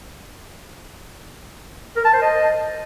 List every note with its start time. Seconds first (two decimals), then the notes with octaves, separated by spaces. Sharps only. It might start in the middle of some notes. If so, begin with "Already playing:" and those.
1.96 A#4
2.05 A5
2.13 C5
2.22 D#5